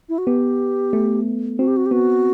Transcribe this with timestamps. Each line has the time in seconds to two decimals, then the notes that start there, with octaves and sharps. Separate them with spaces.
0.09 E4
0.18 F#4
0.27 B3 G4
0.93 A3
1.59 C4 F#4
1.68 G4
1.77 F#4
1.86 G4
1.91 B3 F#4